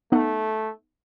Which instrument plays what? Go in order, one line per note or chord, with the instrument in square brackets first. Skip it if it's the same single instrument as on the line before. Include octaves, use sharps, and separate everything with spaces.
[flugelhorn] A3 [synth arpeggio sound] B3 D#4 F#5